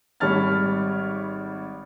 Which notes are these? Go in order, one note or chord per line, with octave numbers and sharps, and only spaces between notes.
G#1 G3 C#5 B5 F6 A6